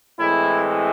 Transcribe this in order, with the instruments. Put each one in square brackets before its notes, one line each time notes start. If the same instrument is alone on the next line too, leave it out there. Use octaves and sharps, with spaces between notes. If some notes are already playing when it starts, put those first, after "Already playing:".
[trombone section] A2 E3 G#3 C4 E4